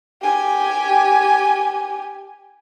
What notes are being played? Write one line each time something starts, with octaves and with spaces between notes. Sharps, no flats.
G4 G#5